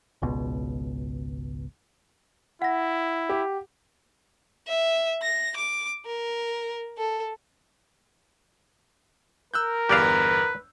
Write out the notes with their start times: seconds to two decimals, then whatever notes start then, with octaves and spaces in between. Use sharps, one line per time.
0.22 G#1 C#2 B2
2.62 E4 F#5 A#6
3.29 G4
4.68 E5
5.23 A#6
5.56 D6
6.05 A#4
6.97 A4
9.54 A#4 E6 F#6 G6
9.89 G1 E2 G4 B4 D5 F5